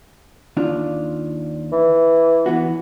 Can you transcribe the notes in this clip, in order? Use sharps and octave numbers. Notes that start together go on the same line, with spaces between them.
D#2 D4 F4
E3
E3 B3 F#4